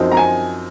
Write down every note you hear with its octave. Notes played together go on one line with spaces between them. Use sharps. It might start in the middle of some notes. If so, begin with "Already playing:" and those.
Already playing: F#2 F3 C4 D#4
A#5
G#5